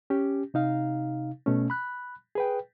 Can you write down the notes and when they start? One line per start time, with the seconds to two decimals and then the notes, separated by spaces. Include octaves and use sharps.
0.10 C#4 G4
0.54 C3 D#4 F5
1.46 B2 A3 C#4
1.70 B5 F#6
2.35 G#4 B4 G5